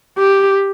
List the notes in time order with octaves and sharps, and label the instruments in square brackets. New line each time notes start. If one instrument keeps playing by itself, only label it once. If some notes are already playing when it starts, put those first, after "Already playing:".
[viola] G4